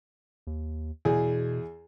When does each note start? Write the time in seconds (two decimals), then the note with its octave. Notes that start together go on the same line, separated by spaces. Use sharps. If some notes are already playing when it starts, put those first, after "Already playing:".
0.47 D#2
1.05 E2 B2 G#4